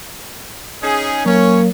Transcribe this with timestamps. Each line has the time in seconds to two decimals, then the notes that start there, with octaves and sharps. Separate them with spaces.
0.82 C#4 D#4 G#4
1.26 F#3 A#3 C#4 C#5